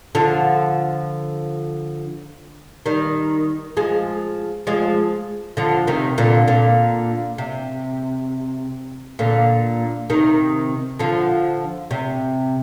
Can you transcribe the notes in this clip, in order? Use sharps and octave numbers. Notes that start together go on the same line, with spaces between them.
D3 F3
D#3 G3
F3 G#3
F3 G#3
D3 F3
C3 D#3
A#2 D3
A#2 D3
C3
A#2 D3
C3 D#3
D3 F3
C3